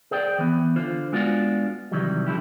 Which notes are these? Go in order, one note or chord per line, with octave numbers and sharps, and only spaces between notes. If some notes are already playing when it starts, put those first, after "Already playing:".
G#4 C5 D5 G5
E3 B3
D3 F4 C5
G#3 B3 D4 F4 F#4
C3 D#3 E3 F#3 G3
D3 F3 E4 G4